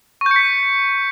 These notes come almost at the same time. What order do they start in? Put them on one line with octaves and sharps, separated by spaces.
C#6 G6 C#7 B6